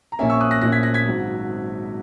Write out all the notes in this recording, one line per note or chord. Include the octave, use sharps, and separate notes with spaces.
A#5
A#1 A#2 A#3 C#4 E5 G#5
C#6 E6
D#6 F#6
F#6 A#6
A#1 A#2 A#3 C#4 F#6 A#6
G#6 B6
F#6 A#6
G#6 B6
G#1 G#2 F#3